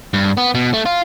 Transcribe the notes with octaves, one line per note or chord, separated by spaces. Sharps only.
G2
B3
B2
A3
F4